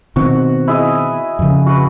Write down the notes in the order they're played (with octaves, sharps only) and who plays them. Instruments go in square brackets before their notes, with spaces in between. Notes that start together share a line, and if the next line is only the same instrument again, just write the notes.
[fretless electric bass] B2 D#3 C4 [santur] F#4
[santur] E4 G#4 D#5
[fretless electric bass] F2 C#3
[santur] F#4 B4